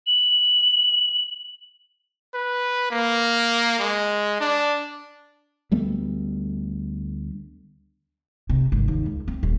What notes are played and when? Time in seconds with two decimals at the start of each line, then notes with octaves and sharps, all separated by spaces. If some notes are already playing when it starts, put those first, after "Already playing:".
0.07 F#7
2.34 B4
2.91 A#3
3.79 G#3
4.40 D4
5.72 D2 G3 A3 B3
8.49 C3
8.72 G#1
8.88 D#2
9.06 C#2
9.28 C4
9.43 D#1